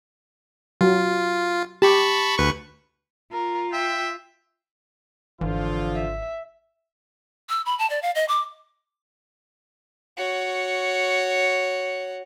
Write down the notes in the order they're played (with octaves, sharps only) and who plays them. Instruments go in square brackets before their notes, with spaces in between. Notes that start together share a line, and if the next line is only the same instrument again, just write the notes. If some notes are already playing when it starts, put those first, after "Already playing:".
[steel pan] F#3 [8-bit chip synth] F4
[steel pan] G4 [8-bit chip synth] A5 B5 C#6
[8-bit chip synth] D2 B4 C#6
[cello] F4 [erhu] A#4
[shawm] E5 [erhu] G5
[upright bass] G#1 [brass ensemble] D3 F3 F4 [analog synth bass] E3
[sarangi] E5
[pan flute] E6
B5
A5
D5
F5
D#5
D6
[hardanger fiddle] F#4 C#5